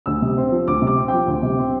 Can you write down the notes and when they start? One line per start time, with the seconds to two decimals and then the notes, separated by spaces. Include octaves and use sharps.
0.06 D2 E6
0.22 C3
0.37 C4
0.51 F3
0.67 D2 D6
0.82 C3
0.87 D6
0.97 C4
1.08 F3 G5
1.27 D2
1.43 C3
1.58 C4